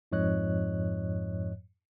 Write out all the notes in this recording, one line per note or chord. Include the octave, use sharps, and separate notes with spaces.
F2 G#2 F3 C#5 D#5 F#6